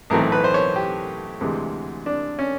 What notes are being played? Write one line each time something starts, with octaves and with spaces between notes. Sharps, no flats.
B1 A2 E3 A3 C4 A#4
B4
C5
C#5
G4
D2 C3 E3 G#3
D4
C#4